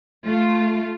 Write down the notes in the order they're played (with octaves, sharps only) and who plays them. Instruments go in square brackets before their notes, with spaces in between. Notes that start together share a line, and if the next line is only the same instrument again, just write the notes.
[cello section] A3 F4